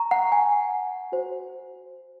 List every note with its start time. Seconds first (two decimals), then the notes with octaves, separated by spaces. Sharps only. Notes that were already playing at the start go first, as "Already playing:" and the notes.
Already playing: A#5 C#6
0.11 F#5
0.32 G#5
1.12 F#4 C5